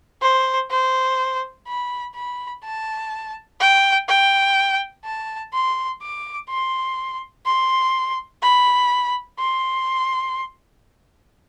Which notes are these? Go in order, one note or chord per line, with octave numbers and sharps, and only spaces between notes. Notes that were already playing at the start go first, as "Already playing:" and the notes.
C5
C5
B5
B5
A5
G5
G5
A5
C6
D6
C6
C6
B5
C6